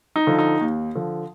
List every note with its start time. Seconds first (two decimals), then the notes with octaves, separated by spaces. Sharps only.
0.16 D#4
0.27 D3 F3
0.38 D#4
0.61 D#2
0.95 D3 F3